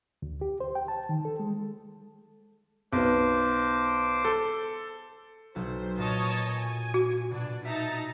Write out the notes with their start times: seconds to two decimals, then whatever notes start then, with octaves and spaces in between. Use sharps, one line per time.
0.22 D2
0.41 G4
0.60 C5
0.75 G5
0.88 A5
1.09 D#3
1.25 A4
1.40 G#3
2.93 B1 B3 C5 D6
4.25 A4
5.55 B1 A4 C5
5.98 A#2 C#5 D#5 A5
6.56 G#5
6.94 F#4
7.31 B2 D4
7.65 D#4 E5 A5 A#5